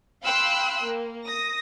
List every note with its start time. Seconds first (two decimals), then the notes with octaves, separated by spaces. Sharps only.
0.23 F5 G5 B5 C6 E6 F#6
0.84 A#3
1.25 D#6 A#6